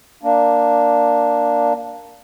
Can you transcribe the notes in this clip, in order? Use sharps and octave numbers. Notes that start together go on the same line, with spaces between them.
A#3 D4